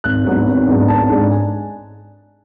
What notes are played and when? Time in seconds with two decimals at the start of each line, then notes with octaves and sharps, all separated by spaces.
0.04 G#1 F#6
0.25 G#2 F#3 B3 D4
0.46 G#1
0.68 G#2 F#3 B3 D4
0.88 G#1 A5
1.09 G#2 G#3 D4
1.31 G#5